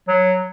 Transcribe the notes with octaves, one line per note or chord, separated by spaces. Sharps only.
F#3